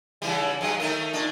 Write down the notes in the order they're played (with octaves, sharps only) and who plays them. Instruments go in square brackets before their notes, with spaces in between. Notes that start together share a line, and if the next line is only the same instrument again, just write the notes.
[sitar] C#3 E3 G3
G2 F#3 G#3
D#3 A3 A#4
A#2 D4